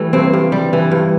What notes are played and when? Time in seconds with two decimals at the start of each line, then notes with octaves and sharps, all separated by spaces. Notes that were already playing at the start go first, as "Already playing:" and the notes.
Already playing: E3 G3 A3
0.13 G2 C4
0.33 G2
0.52 G3
0.73 E3
0.91 G2